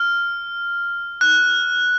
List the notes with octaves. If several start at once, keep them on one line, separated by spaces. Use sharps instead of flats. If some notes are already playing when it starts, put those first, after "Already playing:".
Already playing: F6
F#6